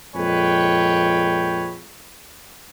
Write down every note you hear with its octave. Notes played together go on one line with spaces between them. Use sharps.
F2 A#2 G#3 B4 C#5 G5